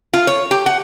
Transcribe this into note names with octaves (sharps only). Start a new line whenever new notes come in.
F4
C#5
G4
F#5